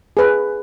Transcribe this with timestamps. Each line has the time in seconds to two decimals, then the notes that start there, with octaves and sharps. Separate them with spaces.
0.17 G#4 B4